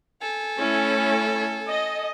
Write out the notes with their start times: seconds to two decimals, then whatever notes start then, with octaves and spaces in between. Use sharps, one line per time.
0.21 A4 G#5
0.57 A3 C#4 E4
1.68 D#5